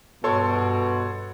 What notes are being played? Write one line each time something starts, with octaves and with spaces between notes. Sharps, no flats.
G2 B2 A4 C#5 C6